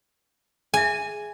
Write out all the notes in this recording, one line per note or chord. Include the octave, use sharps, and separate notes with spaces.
G#4 E5 G#5